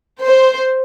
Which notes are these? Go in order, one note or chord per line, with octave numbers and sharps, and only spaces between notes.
C5